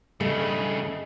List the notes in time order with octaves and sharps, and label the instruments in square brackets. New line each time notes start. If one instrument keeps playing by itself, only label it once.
[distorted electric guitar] G2 C#3 [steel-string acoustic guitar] A3 [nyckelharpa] D#5 B5